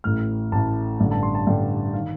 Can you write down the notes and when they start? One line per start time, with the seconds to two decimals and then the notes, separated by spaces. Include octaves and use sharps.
0.04 A1 A2 F6
0.52 A1 A2 A5
1.00 A1 G2 D3
1.11 A5
1.23 C6
1.35 A5
1.46 A1 G2 D3 G5
1.94 D#3 F5